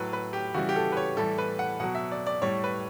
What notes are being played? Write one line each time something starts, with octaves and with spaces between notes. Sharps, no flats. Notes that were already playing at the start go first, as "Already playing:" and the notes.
Already playing: A2 F#3 B4
B4
G4
C#3 E3 G3 F#4
G4
A4
B4
C#5
A2 E3 G3 A4
B4
F#5
B2 F#3 F#5
E5
D5
D5
A2 G3 C#5
B4